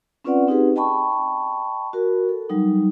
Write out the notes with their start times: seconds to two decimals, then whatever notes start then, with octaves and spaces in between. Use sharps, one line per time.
0.24 C4 C#4 F4 B4 D5 F#5
0.47 C4 D#4 G4 G#4 B4
0.76 D#5 G5 A5 B5 C#6
1.93 F#4 A#4
2.29 A4
2.50 F#3 G3 D#4